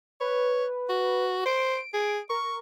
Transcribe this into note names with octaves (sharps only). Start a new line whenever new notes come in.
B4 C#5
F#4
C5 D7
G#4
A#4 C#6